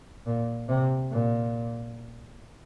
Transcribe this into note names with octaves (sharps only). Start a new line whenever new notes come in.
A#2
C3
A#2